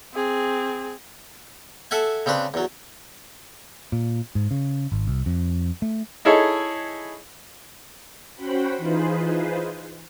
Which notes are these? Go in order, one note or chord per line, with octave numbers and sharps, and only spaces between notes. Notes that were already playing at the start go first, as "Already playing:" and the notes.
C4 G#4
A4 E5 F#5 G#5
C#3 C4 D4 B4 B5
E2 F#3
A#2
G#2
C#3
G#1
C2
F2
A3
D#4 E4 G#4 A4 C#5
C#4 F#4 C5 F#5 G5 B5
E3 D#4 F4 G#4 B4 C5